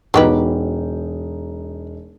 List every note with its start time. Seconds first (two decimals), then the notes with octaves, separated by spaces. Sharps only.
0.14 E1 F#3 D#4 G4 B4